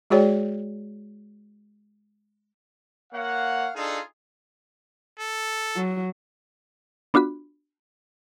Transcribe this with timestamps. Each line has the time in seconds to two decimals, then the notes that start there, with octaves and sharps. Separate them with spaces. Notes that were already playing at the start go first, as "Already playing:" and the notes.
0.10 G#3 F#4 G#4 C#5 D5 G5
3.13 A#3 C#5 F5 F#5
3.75 D4 D#4 F4 G#4 A4 D#5
5.19 A4
5.76 F#3
7.14 B3 D4 F4 F#4 B5